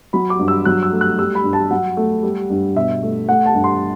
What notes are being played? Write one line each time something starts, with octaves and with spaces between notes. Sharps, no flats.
F#3 B5
D6
G2
E6
F#3 F#6
E6
A3
F#6
G3 E6
B5
G2
A5
F#3 F#5
A3
G3
G2
B2 E5
A3
A3 F#5
A5
G2
C6